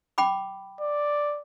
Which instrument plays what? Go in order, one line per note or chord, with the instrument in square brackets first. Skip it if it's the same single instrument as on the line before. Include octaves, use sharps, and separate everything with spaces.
[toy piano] G5 B5 D6
[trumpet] D5